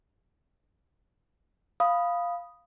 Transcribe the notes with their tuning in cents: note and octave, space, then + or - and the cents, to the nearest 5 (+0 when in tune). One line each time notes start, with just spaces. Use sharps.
F5 +0 B5 +0 D#6 +0